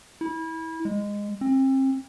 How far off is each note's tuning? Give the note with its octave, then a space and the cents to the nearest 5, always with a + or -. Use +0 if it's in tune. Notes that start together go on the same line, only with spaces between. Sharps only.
E4 -25
G#3 -15
C4 +35